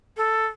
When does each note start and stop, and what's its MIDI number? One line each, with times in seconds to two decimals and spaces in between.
0.17 0.45 69